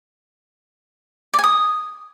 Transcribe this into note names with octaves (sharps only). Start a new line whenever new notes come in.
D5
G#5
D#6